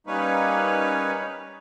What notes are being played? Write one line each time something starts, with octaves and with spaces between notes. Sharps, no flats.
G3 A#3 C#4 D#4 B4 C#5